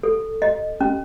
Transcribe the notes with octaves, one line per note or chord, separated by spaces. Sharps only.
A4
D#5
C#4